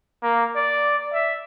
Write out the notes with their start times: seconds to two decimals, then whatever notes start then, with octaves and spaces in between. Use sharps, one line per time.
0.23 A#3
0.56 D5
1.13 E5